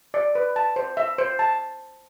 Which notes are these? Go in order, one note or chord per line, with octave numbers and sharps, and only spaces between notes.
D5
B4
A5
C5
E5
C5
A5